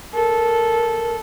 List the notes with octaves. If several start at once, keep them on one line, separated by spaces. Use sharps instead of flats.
A4 A#4